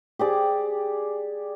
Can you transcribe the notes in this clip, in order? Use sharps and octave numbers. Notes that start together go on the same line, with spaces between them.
G4 G#4 D5